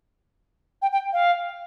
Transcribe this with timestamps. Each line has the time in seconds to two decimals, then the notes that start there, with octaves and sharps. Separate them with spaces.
0.82 G5
0.92 G5
1.13 F5